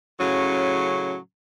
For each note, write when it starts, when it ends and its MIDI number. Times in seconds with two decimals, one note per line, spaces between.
0.20 1.17 45
0.20 1.17 49
0.20 1.17 54
0.20 1.17 61